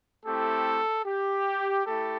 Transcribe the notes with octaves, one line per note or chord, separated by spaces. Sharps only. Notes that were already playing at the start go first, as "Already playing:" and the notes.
A3 C4 E4 G4 A4
G4
A3 E4 G4 A4